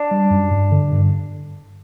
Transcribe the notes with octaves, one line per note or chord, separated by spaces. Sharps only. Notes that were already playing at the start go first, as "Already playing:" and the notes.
Already playing: D4
G3
F#2
G2
D3
G2